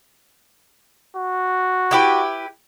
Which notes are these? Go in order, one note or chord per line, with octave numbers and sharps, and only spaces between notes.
F#4
E4 G4 B4